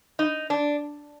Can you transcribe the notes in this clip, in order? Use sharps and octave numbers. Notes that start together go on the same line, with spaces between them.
D#4
D4